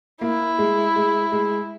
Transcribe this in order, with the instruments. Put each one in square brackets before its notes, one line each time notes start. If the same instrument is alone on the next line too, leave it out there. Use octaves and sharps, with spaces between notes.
[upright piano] A#3 [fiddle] E4
[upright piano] G#3
G#3
G#3